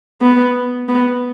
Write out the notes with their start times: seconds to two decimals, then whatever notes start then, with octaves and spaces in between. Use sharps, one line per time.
0.21 B3
0.89 B3